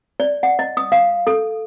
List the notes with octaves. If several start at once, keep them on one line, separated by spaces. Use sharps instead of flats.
D5
F#5
D#5
D#6
F5
A4